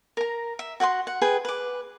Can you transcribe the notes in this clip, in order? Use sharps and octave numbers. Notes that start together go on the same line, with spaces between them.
A#4 A#5
E5
F#4 F#5 G5 C6
F#5
G#4 B4 G5
B4 D6